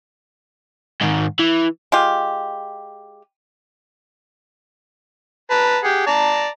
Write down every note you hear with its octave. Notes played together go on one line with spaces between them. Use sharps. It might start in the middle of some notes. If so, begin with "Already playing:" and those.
G#2 D#3
E3
G#3 F4 G4
B4 A5 A#5
G4 G#4 F#5
D5 A5 A#5